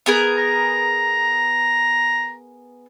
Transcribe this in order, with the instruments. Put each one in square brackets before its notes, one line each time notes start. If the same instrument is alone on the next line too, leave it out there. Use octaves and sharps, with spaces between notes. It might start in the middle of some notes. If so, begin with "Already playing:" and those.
[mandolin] B3 G#4 A#4
[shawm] A#5